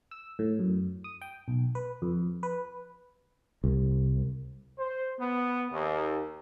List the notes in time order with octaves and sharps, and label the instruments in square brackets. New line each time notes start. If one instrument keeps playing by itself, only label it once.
[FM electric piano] E6
A2
F#2
D#6
G5
B1
B4
F2
B4
[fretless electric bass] C2
[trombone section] C5
B3
D#2